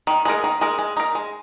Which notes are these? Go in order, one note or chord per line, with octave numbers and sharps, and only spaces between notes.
D#3
G#3 D#4 A#4
D#3
G#3 D#4 A#4
G#3
D#4 A#4
G#3